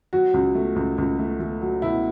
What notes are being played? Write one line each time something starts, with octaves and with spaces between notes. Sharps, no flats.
F#3 F#4
C#2
A3
C#2
C#2
A3
A3
F#3
B2 E4